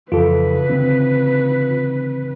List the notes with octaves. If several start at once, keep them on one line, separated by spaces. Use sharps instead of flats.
F2 C#3 E3 F4 A4 B4
D3 C4